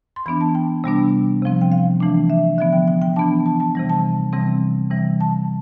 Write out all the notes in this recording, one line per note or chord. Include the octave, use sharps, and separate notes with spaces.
C6
E3 B3 D4 B5
A5
G5
C3 G3 B3 D4
C3 F3 C4
G5
F5
E3 A3 D4
E5
D3 F3 B3 E5
G5
G5
G5
E3 B3 D4 A5
A5
A5
C3 E3 G3
A5
C3 E3 G3 C4
C3 E3 G3
A5